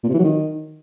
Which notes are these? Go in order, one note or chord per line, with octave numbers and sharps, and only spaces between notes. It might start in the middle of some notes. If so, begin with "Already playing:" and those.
A#2
C3
E3
F#3
D#3